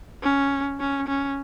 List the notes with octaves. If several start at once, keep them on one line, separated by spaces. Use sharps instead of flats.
C#4
C#4
C#4